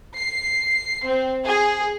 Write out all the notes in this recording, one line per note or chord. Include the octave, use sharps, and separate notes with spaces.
C7
C4
G#4